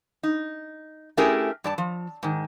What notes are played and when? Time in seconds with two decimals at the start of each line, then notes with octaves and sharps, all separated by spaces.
0.23 D#4
1.17 A3 C#4 E4 G4 G#4 A#4
1.64 G2 D5 A5
1.78 F3
2.23 G#2 D#3